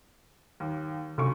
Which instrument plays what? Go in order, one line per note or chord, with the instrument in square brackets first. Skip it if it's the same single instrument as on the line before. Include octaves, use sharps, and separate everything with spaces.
[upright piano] D#2
[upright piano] F#1 D2 C#6 [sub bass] C3